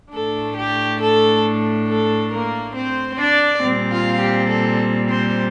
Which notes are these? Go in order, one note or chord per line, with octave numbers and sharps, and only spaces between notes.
A2 A3 D4 A4
G4
A4
A4
A#3 A#4
C4 C5
D4 D5
A#2 G3 C4
F4 F5
G4
A4
C4 C5